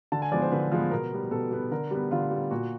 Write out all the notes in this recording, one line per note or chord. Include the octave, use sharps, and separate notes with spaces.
D3 A5
G#5
F3 G#3 B3 D5
C5
D3 B4
F3 G#3 B3
B2 A#4
G3 B3
B2 A4
G3 B3
D3 A#4
G3 B3
D3 F4
G3 B3
A#2 F#4